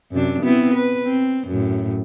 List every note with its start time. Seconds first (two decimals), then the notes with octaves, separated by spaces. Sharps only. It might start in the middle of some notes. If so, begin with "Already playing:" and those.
0.12 F#2 C3 D4
0.42 B3 C4 E4
0.74 B4
1.05 C4
1.47 F#2 A2